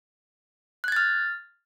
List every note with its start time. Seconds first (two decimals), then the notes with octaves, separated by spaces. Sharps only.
0.84 F#6
0.88 G#6
0.92 A6
0.96 F6